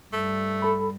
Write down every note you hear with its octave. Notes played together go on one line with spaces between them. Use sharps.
G2 A3
A4 B5